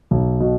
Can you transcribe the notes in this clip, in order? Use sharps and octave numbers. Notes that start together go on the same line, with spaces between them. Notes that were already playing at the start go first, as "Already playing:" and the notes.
B1
B2